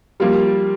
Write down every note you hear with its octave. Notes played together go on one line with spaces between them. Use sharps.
F3 G3 A#3 F4